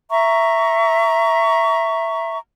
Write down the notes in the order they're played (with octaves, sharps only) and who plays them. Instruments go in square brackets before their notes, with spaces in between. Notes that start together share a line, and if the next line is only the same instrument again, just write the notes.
[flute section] E5 A#5 C#6